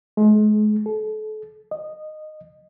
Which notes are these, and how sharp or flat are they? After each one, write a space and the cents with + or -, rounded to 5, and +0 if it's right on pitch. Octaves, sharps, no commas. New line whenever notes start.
G#3 +35
A4 -35
D#5 -15